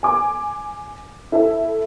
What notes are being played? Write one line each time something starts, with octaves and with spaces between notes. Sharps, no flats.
G#5 D6
E4 A4 E5